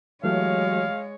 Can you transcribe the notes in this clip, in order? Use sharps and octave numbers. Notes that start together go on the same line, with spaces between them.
E3 F#3 G#3 A3 G4 C#5 F5